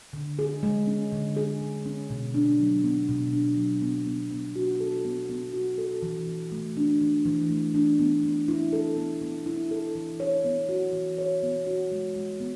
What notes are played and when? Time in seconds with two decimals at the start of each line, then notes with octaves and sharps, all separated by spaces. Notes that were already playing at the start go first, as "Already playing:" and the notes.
0.13 D3
0.39 G#4
0.63 G#3
0.87 C#4
1.12 D3
1.37 G#4
1.61 G#3
1.85 C#4
2.10 B2
2.34 D4
2.59 F#3
2.84 B3
3.08 B2
3.33 D4
3.57 F#3
3.82 B3
4.06 B3
4.31 B3
4.56 F#4
4.80 A4
5.05 B3
5.29 B3
5.53 F#4
5.78 A4
6.02 E3
6.28 E3
6.52 A3
6.77 D4
7.01 E3
7.26 E3
7.50 A3
7.75 D4
7.99 B3
8.23 B3
8.48 E4
8.73 A4
8.97 B3
9.22 B3
9.46 E4
9.71 A4
9.95 E3
10.20 C#5
10.45 B3
10.69 F#4
10.93 E3
11.18 C#5
11.43 B3
11.67 F#4
11.92 G#3
12.16 G#3
12.40 B3